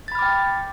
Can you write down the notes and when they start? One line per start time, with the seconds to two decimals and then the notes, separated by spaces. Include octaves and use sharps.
0.08 A6
0.12 B5
0.15 F6
0.19 D6
0.22 G5